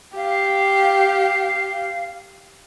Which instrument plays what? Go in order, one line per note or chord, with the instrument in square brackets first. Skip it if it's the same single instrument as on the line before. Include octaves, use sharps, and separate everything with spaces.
[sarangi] G4 [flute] F5